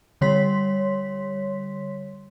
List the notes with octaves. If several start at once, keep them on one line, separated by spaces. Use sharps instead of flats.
D3 G3 C#5 C6 B6